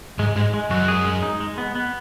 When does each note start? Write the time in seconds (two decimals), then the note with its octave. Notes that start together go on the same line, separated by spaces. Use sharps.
0.19 G#2 G#3
0.36 G#2 G#3
0.54 G#3
0.70 F#2 F#4
0.88 G#4
1.05 G#3
1.23 D#4
1.40 G#3
1.58 B3
1.75 B3